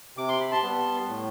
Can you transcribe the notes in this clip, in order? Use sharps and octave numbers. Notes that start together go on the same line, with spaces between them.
C3 D6
C6
B5
A5 C6
G3 B3
A2